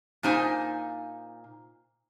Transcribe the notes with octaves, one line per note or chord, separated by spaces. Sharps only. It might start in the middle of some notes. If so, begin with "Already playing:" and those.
A#2 A#3 D#4 C5 G#5